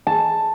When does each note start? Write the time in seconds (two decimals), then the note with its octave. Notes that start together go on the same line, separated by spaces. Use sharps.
0.07 A5